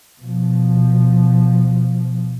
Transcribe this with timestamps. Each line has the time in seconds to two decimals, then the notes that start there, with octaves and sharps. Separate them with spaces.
0.21 B2 F3